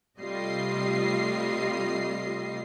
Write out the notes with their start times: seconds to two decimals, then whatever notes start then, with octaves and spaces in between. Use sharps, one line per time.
0.19 C3 G3 A3 F4 D#5 C7